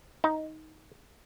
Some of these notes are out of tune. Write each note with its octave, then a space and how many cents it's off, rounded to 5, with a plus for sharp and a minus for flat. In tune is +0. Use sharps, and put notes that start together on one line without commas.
D#4 +10